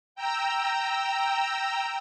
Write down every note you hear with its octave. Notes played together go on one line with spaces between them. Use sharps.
G5 A#5 E6